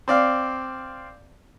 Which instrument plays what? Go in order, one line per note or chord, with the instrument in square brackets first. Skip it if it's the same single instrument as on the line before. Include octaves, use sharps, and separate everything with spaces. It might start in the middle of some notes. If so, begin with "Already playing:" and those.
[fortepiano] C4 D5 F5